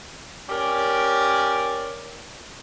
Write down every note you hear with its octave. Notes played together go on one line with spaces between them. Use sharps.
C#4 G4 A#4 D5